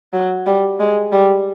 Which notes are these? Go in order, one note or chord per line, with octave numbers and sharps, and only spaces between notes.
F#3
G3
G#3
G3